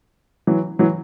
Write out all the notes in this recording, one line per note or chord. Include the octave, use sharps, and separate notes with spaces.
E3 F#3
E3 F#3